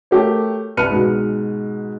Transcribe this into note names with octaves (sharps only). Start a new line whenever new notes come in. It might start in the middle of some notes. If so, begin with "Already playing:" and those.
A3 G4 A#4 C#5
C2 B4 F6 C#7 D#7
G#2 B2